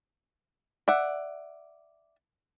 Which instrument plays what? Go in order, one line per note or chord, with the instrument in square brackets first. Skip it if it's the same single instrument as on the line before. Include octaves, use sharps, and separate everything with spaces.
[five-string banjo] D5 E5 F#5